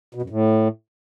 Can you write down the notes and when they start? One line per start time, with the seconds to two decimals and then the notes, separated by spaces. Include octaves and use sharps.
0.15 B2
0.22 F#2
0.30 A2